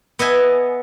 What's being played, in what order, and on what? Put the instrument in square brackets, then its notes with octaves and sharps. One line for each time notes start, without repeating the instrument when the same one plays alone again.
[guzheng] B3 D#5 E5 G#5